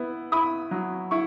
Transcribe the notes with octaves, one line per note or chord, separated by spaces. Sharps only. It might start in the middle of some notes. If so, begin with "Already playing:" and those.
Already playing: B3 E4
E4 B5 D#6
F#3
E4 C#6